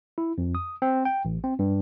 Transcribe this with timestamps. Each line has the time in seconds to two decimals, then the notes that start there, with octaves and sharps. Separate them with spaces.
0.18 E4
0.38 F2
0.55 D#6
0.82 C4
1.05 G5
1.25 A1
1.44 C4
1.59 G2